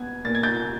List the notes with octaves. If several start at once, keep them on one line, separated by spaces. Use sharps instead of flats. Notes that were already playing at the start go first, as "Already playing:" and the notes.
Already playing: B3 G#6
A#2 A6
G#6
G6 A6